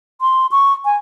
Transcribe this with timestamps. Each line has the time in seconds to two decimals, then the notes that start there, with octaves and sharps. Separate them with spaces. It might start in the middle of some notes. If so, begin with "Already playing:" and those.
0.21 C6
0.51 C#6
0.85 G#5